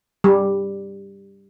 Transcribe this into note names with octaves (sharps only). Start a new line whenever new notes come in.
G3